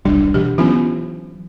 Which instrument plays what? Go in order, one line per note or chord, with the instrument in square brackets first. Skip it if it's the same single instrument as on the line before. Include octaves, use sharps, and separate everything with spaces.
[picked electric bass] D#1 B1 G3 [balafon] D4
[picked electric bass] B2 E3 [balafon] G4
[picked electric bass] E3 F#3 [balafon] B3 C#4 F4